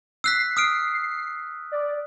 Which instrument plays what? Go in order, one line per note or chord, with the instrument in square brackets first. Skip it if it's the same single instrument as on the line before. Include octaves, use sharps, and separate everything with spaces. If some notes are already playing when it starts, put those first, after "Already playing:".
[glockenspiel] E6 F#6 B6 [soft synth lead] C7
[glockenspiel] D#6 F6 D7
[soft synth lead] D5